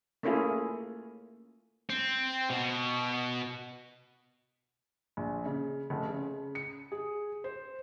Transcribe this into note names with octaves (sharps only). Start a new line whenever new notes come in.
A3 A#3 C#4 E4 F4 G#4
C4
B2
A#1
C#3
F1
C#3
C#7
G#4
C5